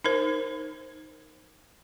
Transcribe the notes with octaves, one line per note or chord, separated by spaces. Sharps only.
D#4 A#4 C5